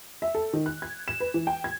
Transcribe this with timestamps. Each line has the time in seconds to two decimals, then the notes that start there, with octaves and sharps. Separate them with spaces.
0.22 E5
0.35 A4
0.53 D#3
0.66 F#6
0.82 G#6
1.08 E7
1.20 B4
1.34 E3
1.47 G5
1.64 G#6